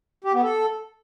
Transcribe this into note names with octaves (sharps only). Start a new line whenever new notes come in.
G4
B3
A4